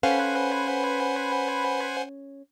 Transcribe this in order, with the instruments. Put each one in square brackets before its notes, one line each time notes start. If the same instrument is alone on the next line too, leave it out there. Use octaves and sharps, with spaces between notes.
[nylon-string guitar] C#4 A4 F5 [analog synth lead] B4 [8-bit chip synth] C5 F#5 G#5